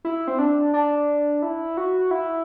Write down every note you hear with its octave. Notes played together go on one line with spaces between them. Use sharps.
E4
C4
D4
D4
E4
F#4
E4